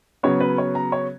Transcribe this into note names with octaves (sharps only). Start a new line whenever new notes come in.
C#3 F#3 B3 C#5
B4
C#5
A#5
C#5